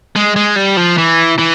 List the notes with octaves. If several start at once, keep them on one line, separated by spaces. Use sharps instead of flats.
G#3
G#3
G3
F3
E3
E3